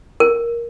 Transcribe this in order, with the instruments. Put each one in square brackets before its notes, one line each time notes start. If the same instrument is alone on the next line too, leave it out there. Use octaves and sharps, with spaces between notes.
[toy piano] A#4